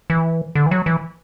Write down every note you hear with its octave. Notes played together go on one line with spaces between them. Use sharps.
E3
D3
E3
F#3
E3